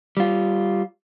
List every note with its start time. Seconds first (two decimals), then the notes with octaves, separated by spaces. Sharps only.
0.17 G3 F4